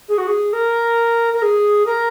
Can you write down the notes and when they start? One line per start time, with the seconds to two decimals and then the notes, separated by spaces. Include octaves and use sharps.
0.09 G#4
0.18 F#4
0.27 G#4
0.53 A#4
1.34 A#4
1.42 G#4
1.86 A#4